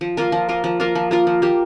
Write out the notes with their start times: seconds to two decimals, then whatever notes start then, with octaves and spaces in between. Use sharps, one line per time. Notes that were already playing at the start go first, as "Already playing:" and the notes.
0.01 F3
0.17 A#3 F4 A#4
0.32 F3
0.49 A#3 F4 A#4
0.64 F3
0.80 A#3 F4 A#4
0.95 F3
1.11 A#3 F4 A#4
1.27 F3
1.42 A#3 G4